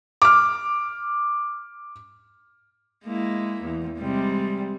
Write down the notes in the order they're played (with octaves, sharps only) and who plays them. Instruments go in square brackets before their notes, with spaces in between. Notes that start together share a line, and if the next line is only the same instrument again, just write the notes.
[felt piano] D6 F6
[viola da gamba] G#3 A#3 E4
E2
C3 G3 G#3